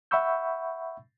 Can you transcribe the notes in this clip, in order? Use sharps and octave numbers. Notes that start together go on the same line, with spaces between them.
E5 F#5 B5 C#6 E6 G6